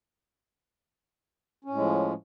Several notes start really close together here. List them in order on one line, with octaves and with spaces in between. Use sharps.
C#4 A2 G#3 F3